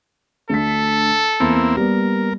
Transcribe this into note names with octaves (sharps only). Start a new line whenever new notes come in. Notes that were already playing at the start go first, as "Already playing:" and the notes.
D2 D3 A4 B6
E2 A#3 C4 E4
G3 A#3 B3 A#4